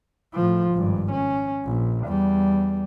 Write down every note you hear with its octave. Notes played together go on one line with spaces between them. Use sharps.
A2 F3
G#1 G2
C#4
A#1
E2 G3